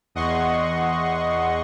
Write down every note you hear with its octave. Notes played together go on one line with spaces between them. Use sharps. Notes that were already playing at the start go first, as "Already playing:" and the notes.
E2 D#5 F#5 C6 C#6